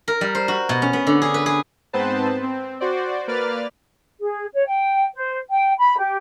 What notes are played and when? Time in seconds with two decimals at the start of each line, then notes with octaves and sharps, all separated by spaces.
0.08 A#4
0.21 G3
0.35 C5
0.48 F#4
0.69 B2
0.82 C#4
0.93 B3
1.07 D3
1.22 G#4
1.34 B4
1.46 G#4
1.93 G#2 B3 C4 B4 C5 A5
2.43 C4
2.80 F#4 C5 D5
3.28 A#3 B4 D5 F6 A6
4.20 G#4
4.54 C#5
4.66 G5
5.14 C5
5.50 G5
5.78 B5
5.96 G4